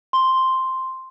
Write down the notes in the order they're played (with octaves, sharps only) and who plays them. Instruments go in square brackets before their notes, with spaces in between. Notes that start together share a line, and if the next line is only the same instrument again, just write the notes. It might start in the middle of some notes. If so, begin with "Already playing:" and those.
[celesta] C6